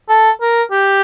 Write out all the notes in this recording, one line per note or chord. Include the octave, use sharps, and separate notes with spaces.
A4
A#4
G4